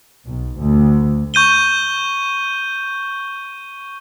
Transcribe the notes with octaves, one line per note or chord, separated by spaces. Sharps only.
B1
D2
C#6 G6 D#7 G7